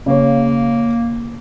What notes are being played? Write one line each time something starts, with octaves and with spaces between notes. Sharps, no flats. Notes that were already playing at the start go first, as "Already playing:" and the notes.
C#3 A#3 C#5